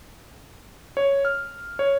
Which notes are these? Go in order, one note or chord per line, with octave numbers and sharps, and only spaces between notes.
C#5
F6
C#5